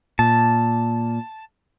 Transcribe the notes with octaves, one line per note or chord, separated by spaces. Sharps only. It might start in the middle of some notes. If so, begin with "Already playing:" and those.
A#2 A5